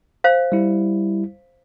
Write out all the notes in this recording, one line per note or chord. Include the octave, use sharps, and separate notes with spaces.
C5 F5
G3 E4